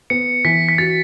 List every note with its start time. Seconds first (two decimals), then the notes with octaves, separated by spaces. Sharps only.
0.10 B3 C#7
0.45 E3 B6
0.69 B6
0.78 F#4 A6